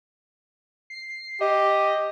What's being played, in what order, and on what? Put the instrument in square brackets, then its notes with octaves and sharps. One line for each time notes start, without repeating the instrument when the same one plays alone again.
[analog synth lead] C7
[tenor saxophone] G4 [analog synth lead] D#5